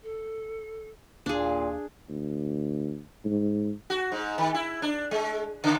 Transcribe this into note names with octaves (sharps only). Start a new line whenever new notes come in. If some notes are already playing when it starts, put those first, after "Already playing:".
A4
D#2 A#2 D4 G#4 F5
D2
G#2
F#4
G#2
D#3
E4
D4
G#3
C#3